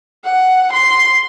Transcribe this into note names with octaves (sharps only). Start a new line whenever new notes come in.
F#5
C6